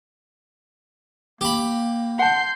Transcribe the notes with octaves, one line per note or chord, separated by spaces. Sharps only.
A#3 G4 B5
F#5 A5 C6 G6